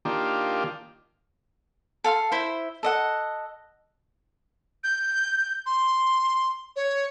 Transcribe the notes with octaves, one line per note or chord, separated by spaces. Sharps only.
D#3 A#3 D4 F4 G4
A4 F5 C6
E4 C5
A4 D#5 F#5
G6
C6
C#5